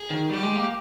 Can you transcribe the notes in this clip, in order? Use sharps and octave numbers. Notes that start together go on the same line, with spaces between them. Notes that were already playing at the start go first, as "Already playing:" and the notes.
Already playing: G#4
D#3
G3 G4
G#3
A#3